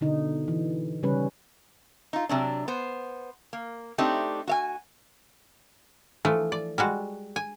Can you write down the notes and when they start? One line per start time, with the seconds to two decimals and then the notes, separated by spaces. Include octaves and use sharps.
0.01 B2 D3 D#4
0.48 E3
1.03 C#3 G3 C#4 B4
2.13 D#4 F4
2.29 C3 F#3 D4
2.68 B3 C5
3.53 A#3
3.98 A3 C4 D4 D#4 G4
4.47 F#4 F5 G#5
6.25 E3 F3 A3
6.52 D5
6.78 G3 G#3 F#4
7.36 G#5